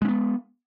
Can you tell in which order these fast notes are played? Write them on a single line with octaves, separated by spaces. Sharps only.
G#3 C#4 B3